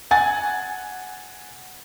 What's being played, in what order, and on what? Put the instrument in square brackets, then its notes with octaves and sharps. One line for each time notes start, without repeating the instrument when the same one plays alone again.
[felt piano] F#5 G#5 A6